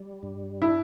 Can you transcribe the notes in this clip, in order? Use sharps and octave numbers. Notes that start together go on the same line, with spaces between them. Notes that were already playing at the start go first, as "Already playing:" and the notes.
Already playing: G3
G2
D4 E4